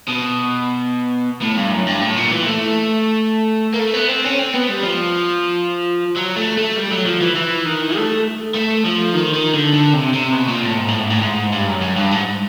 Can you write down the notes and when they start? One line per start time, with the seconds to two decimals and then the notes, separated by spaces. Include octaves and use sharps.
0.08 B2
1.42 A2
1.56 G2
1.71 F#2
1.87 G2
2.02 A2
2.16 A#2
2.31 E3
2.46 A3
3.74 A#3
3.79 A3
3.94 B3
4.09 C4
4.24 C#4
4.39 C4
4.54 B3
4.69 G3
4.83 F3
6.17 F#3
6.37 A3
6.57 A3
6.76 G3
6.91 F#3
7.06 F3
7.21 E3
7.36 E3
7.66 D#3
7.96 A3
8.54 A3
8.85 F3
9.14 D#3
9.34 D#3
9.54 D3
9.74 D3
9.94 C3
10.14 C3
10.33 B2
10.48 A#2
10.63 A2
10.78 G#2
10.88 A2
11.00 G#2
11.10 A2
11.22 G#2
11.53 G2
11.67 F#2
11.82 F#2
11.97 G2
12.12 G#2